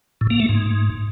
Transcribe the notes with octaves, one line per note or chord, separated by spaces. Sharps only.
A2
A#3
A3
G#2